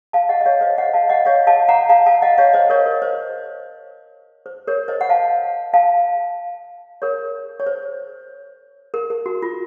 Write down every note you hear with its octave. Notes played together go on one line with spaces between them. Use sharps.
F5 A5
D#5 F#5
D#5
C#5 F5
C5 D#5
D#5 F#5
F5 A5
D#5 F#5
C#5 F5
F5 A5
F#5 A#5
F5 A5
F5 A5
D#5 F#5
C#5 F5
C5 D#5
A#4 C#5
A#4
C5
C5
A#4 C#5
C5 D#5
F#5
F5 A5
F5 A5
A#4 C#5
C#5
C5
A#4
A#4
F#4
F4